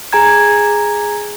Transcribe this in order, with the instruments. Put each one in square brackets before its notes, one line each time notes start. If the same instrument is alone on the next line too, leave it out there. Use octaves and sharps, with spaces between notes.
[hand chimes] G#4 G#5 A#5 G#6